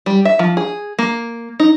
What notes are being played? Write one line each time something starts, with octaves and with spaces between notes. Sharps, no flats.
G3
E5
F3
G#4
A#3
D#4